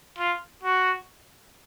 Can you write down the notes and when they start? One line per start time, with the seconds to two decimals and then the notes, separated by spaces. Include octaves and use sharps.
0.18 F4
0.63 F#4